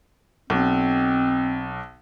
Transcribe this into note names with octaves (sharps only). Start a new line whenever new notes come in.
B1 C4